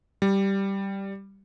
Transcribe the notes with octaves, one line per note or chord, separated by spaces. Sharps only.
G3